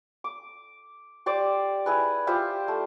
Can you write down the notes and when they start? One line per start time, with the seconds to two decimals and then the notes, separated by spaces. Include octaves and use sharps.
0.24 D6
1.26 G4 C5 D5 D6
1.86 E4 G#4 B4
2.27 E4 F4 G4 C5
2.68 A3